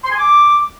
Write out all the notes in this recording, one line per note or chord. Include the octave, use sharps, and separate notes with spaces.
C6
G#5
D6